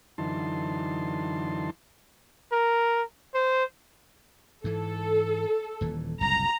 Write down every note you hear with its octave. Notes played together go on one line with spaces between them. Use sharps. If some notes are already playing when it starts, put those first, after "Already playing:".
F#2 D3 E3 D#4 A5 C6
A#4
C5
G#2 E3 A4
D#1 A#2 E3
F#1 C2 A#2 A#5